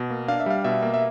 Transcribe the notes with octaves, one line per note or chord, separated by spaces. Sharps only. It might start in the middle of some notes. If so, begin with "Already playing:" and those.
Already playing: B2
A#3
D4 F5
E5
G3 F5
B2 E5
A#3
E5